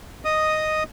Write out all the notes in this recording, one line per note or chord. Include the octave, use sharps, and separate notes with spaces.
D#5 D#6